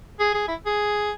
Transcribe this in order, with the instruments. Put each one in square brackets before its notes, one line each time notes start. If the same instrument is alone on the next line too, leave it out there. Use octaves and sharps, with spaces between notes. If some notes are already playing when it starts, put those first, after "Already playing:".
[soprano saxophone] G#4
G#4
E4
G#4